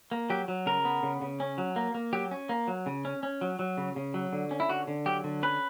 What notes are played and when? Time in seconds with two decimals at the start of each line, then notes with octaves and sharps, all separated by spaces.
0.11 A#3
0.30 F#3 G4
0.48 F#3
0.66 C#3 A#4
0.85 B3
1.03 C#3
1.21 C#3
1.40 C#4
1.58 F#3
1.76 A#3
1.95 A#3
2.13 F#3 G4
2.31 C#4
2.49 A#3
2.67 F#3
2.86 C#3
3.05 C#4
3.23 C#4
3.41 F#3
3.59 F#3
3.78 C#3
3.96 C#3
4.14 F#3
4.33 D3
4.51 C#4
4.60 E4
4.69 D3 F#4
4.88 D3
5.06 F#3 G4
5.24 D3
5.43 C#4 B4